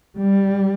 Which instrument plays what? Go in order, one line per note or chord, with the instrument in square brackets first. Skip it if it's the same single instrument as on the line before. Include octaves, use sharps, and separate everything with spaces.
[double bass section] G3